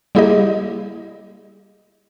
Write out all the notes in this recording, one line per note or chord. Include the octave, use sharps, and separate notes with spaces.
G3 A#3 E4 G4 G#4 D#5